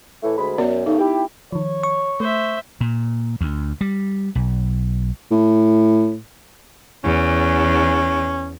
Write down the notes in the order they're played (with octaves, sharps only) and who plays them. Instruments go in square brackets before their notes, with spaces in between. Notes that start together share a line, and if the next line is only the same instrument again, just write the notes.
[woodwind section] A2 E3 A3
D2 G#3 B5
[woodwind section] F#2 [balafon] B3 A#4 D5
[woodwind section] G2 C#3 A3 [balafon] D#4
[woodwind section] E4 G4
[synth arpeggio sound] D#3 F3 [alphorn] C#5
[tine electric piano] C#6
[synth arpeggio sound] A3 [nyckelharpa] C5 E5
[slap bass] A#2
D2
G3
B1
[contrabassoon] A2
[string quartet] E2 [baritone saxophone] C#4